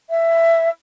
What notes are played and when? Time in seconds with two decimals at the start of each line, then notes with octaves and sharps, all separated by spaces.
0.10 E5